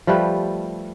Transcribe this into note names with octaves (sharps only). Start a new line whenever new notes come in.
F3 G3 A3 B4